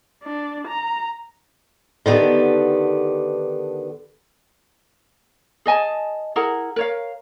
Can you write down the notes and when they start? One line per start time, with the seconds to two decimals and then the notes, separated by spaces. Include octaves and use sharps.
0.24 D4
0.68 A#5
2.06 D3 D#3 B3 G4 A4
5.66 G#4 D#5 G#5 A5
6.36 E4 G#4 A#4 F#5
6.76 A#4 C#5 F5